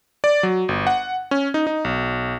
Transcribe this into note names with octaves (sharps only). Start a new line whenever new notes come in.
D5
F#3
G1
F#5
C#4
D#4
D#4
B1